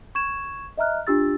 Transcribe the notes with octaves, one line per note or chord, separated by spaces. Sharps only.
C#6 G#6 E7
D#5 E5 A#5 F6 F#6
D4 F4 G4 E6 A6